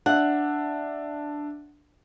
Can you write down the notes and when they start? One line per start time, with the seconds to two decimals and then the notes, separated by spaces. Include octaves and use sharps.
0.06 D4 E5 F#5